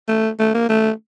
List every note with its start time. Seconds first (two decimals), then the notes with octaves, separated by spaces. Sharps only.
0.08 A3
0.39 A3
0.54 A#3
0.69 A3